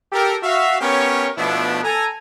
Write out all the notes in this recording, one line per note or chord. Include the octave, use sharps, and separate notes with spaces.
G4 A4 A#4
F#4 E5 F5
B3 C#4 G4 A#4 C#5
B2 F3 A3 B3 D4 E4
A4 G#5 A#5